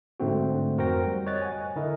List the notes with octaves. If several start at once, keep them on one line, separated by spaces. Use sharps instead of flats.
G#2 D3 A3 C4 F#4
F2 F#4 A#4 C5 G5 A#6
G3
C#5 D#5 F#6 A6
F#5 G#5
D3 E4 A#4 D#5